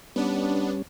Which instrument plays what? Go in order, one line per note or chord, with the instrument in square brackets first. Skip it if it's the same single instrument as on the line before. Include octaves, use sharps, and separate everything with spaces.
[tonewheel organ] G3 C#4 [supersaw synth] B3 D4